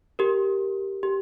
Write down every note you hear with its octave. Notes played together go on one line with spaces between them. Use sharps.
G4 A#4
G4